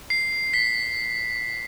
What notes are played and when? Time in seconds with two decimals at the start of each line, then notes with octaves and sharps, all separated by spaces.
0.10 C7
0.54 B6